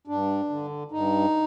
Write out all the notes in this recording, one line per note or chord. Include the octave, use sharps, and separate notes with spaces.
G2 D4
D3
G2 D#4